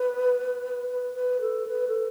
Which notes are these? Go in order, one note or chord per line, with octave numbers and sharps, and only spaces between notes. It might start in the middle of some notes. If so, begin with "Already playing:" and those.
Already playing: B4
B4
B4
A4
B4
A4